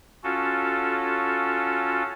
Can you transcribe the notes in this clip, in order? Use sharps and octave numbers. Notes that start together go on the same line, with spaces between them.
C#4 F4 F#4 A4